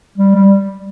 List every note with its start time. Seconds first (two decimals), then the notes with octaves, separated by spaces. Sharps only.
0.18 G3
0.35 G3